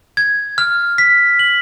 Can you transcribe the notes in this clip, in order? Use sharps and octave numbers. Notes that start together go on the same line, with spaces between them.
G#6
F6
B6
F#7